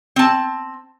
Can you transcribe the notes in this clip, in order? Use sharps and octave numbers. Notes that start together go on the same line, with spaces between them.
C4 A5